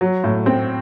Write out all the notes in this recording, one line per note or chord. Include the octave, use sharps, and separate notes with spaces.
F#3
A2
C4